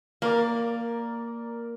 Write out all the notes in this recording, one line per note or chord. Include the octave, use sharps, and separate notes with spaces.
A#3 A#4 D5 A#5